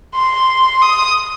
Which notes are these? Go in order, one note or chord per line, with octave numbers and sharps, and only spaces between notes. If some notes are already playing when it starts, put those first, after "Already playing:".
C6
D#6